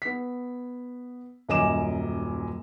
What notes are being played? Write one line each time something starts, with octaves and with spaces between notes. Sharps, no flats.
B3 B6
D#1 F#2 D#5 G#5 D6 E7